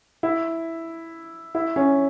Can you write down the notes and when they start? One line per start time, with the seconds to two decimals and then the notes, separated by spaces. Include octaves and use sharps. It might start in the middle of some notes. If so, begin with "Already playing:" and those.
0.23 E4
1.55 E4
1.76 C#4